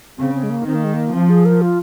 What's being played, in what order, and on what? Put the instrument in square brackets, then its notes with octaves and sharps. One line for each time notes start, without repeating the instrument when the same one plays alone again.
[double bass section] C#3 [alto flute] C4
[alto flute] C4
G#3
A#3
[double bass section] D#3 [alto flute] C4
[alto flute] A#3
G#3
A#3
[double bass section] F3 [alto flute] C4
[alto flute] G#4
A#4
F4